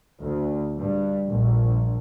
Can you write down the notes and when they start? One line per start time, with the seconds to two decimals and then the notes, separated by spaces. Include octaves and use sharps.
0.20 D2
0.77 G2
1.29 A#1